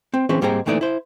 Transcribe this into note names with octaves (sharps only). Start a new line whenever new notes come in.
C4
E3 C4 C#4 G#4 B4
G#2 G3 A#3 C4 G#4 A#5
D2 A#2 E3 A3 D#4 D5
E4 C5